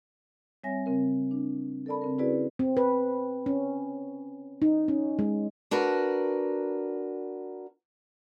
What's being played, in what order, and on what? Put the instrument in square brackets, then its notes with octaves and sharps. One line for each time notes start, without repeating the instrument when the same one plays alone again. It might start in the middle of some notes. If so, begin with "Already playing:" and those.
[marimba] G3 C4 C#5 E5 G#5 A#6
C#3 C4 A#4
D4
A4 A#4 D5 A5 B5
C#3 C4 A#4
C#4 E4 F#4 G#4 B4 D5
[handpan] C4
B4
C#4
D#4
C#4
G#3
[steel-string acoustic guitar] D4 F#4 A#4 B4